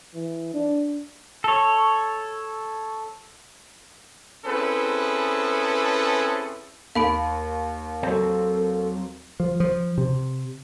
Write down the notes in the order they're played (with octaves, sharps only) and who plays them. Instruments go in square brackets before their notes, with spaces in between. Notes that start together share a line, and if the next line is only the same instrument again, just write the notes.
[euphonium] E3
D4
[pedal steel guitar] A4 C#5
[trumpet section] C4 C#4 E4 G#4 A4 B4
[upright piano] D#2 [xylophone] F5 B5 D7
[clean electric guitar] F#3 C4 [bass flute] A4
[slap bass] F3
F3
C3